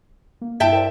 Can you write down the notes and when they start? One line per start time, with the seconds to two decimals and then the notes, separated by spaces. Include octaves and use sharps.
0.41 A#3
0.60 G2 E4 E5 G5 A5
0.72 A#4 C5 D5